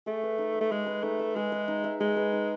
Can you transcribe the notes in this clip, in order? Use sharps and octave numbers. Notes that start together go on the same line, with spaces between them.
A3 G#4
B4
D#4
E5
A3
G#3 G#4
B4
A3 D#4
E5
G#3 G#4
B4
D#4
E5
G#3 G#4
B4
D#4